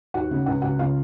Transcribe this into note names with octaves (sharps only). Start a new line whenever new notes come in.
D#2 F#4 F#5
C#3
C#2 F#5
C#2 F#4 F#5
C#3 F4 F5